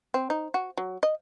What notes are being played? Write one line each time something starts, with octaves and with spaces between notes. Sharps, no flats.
C4
D#4
F#4
F#3
D#5